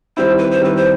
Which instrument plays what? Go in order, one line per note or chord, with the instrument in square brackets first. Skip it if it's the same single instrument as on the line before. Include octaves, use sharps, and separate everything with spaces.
[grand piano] D#3 G3 C4 E4 [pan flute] C5
[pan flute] B4
C5
[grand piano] D#3 G3 C4 E4 [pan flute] B4
[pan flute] C5